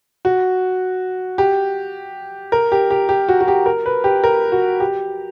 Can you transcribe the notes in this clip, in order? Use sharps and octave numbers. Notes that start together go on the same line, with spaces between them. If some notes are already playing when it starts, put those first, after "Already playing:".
F#4
G4
A#4
G4
G4
G4
F#4
F#4
G4
A#4
B4
G4
A#4
F#4
G4